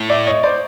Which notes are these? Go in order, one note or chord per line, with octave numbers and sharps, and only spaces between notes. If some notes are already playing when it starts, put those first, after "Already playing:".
Already playing: A2
D5 E5
C#5 D#5
C5 D5